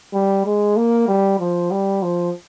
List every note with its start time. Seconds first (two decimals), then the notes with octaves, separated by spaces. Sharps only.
0.14 G3
0.45 G#3
0.77 A#3
1.08 G3
1.39 F3
1.71 G3
2.03 F3